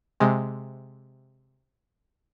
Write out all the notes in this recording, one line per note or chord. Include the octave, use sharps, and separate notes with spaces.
C3 G#3